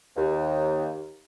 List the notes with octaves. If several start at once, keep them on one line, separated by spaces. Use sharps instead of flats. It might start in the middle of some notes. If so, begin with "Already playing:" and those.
D#2